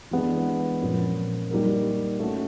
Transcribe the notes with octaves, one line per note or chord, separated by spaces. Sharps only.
E3 G#3 B3 D4
A#2 F3 A#3 C#4
G3 A#3 D#4 F#4 A#4
A3 C#4 F#4